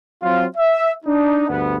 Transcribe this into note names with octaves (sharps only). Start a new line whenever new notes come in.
F#3 C4 F4
E5
D4 D#4
D2 G2 B3